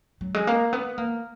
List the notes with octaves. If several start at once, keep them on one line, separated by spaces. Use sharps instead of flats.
F#3
G#3
A#3
B3
A#3